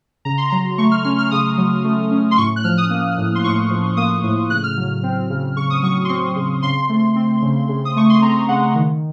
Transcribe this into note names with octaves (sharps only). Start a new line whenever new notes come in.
C#3 A#5
C6
F#3 A#5
A3 C#6
F6
C#4 F6
F6
C#3 D#6
F#3
A3
C#4
C6
A2 C#6
F#6
F3 F6
D#6
A#3
A2
C6
A2 C#6
F3
A#3 D#6
A2
C#3 F#6
F6
F#3
C4
C#3
C#3 C#6
D#6
F#3 C#6
C6
C4 C#6
C#3
C#3 C6
A3
C4
C#3
C#3
D#6
A3 C#6
C6
C4 A#5
C#3 F#5
D#3